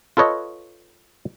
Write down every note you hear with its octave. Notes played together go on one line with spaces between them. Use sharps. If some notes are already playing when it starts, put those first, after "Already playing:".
F4 A4 B4 C#5 D#5